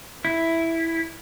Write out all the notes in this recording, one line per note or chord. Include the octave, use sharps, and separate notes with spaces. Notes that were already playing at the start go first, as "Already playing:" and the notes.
E4